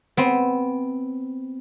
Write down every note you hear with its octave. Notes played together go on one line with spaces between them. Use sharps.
B3 C4